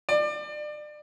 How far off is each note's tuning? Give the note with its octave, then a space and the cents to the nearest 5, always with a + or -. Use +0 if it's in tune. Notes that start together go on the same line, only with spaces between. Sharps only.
D5 +30